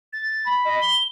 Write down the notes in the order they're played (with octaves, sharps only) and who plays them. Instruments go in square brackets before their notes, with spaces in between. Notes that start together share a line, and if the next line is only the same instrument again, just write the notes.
[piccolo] A6
[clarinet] B5
[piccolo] D#5
G7